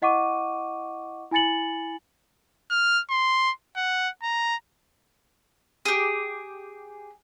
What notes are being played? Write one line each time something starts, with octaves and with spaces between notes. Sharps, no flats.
E4 D#5 F#5 C#6 D6 D#7
E4 G#5 B5 A6 C#7 F#7
F6
C6
F#5
A#5
G4 G#4